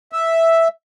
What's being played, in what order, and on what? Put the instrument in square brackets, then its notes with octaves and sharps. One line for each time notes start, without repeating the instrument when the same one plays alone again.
[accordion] E5